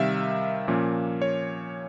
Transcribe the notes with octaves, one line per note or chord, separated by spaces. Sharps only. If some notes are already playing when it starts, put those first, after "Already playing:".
Already playing: C3 D#3 G3 E5 F5
A#2 F3 A#3 C#4
C#5